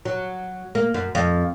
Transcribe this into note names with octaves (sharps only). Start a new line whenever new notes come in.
F#3
A#3
F#2
F2